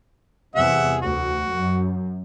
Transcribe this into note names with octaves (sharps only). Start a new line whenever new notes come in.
E2 C3 G3 G#4 E5 F#5
D2 F#4
F#2